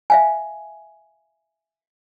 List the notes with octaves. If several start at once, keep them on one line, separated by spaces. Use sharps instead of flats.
E5 F5 G#5